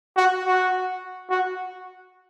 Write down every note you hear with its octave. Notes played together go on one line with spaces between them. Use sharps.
F#4
F#4
F#4